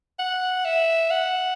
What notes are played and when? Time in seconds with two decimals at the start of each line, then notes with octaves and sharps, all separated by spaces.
0.19 F#5
0.65 E5
1.11 F#5